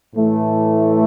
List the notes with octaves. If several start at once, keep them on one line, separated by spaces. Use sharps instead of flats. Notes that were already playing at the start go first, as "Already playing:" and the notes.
A2 E3 A3